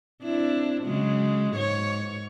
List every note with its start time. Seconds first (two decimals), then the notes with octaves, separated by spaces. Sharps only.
0.23 C4 D4 E4
0.83 C#3 F#3 G#3
1.54 G#2 C#5